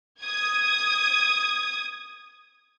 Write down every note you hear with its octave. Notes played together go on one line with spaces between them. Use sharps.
D#6 G#6